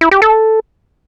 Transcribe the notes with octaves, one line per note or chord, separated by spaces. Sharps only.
E4
G4
A4